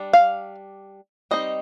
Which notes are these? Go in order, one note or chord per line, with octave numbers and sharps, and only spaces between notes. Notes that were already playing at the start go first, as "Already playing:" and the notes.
Already playing: G3 D4
F5
G3 C4 D#4 D#5